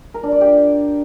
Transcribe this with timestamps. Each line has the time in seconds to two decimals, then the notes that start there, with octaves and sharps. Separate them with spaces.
0.14 A#4
0.23 D4
0.32 D5
0.41 G4